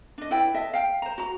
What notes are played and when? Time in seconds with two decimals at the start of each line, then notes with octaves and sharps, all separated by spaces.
0.18 D4 D#5
0.31 E4 B4 D5 G5
0.54 D#5 E5 A5
0.74 F5 G5
1.02 C5 A#5
1.18 F#4 A#5